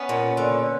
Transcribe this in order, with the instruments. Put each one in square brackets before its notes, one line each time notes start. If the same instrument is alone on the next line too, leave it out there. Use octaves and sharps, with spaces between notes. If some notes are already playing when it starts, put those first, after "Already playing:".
Already playing: [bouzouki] B3 C#4
A#2
D3